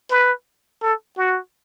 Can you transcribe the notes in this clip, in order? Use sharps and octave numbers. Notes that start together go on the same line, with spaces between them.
B4
A4
F#4